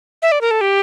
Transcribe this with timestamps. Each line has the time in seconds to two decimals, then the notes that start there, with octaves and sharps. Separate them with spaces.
0.22 E5
0.32 D5
0.41 A#4
0.51 A4
0.61 G4